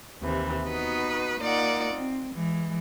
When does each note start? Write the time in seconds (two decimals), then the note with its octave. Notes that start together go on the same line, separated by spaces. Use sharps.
0.21 D#2 C3 E3
0.65 B3 D#4 F#4 B4
1.39 A#3 D#4 F4 D5 F#5
1.94 C4
2.33 E3 G#3